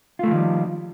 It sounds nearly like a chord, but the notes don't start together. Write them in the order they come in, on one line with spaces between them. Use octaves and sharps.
F4 A3 F3 D#3 G3